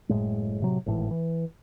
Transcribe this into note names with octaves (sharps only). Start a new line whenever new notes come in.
F#1 A2 G#3
A2 C3 F#3
G#1 A2 E3
E3